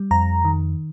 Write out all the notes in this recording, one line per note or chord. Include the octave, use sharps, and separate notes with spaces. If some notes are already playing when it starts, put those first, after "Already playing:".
Already playing: G3
F2 A#5
D#3